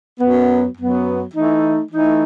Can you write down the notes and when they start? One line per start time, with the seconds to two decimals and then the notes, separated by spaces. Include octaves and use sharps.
0.20 F#2 F#3 B3
0.78 F#2 F#3 B3
1.34 E3 A3 D#4
1.92 E3 A3 D#4